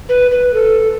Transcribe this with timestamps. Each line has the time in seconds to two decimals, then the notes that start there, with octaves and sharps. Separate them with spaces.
0.09 B4
0.31 B4
0.54 A4